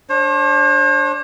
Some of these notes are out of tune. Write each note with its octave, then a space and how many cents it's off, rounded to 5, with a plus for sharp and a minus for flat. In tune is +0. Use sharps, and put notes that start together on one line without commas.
D4 -5 C5 +45